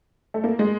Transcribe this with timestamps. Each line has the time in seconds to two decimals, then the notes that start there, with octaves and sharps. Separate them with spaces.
0.34 A3
0.44 A#3
0.59 G#3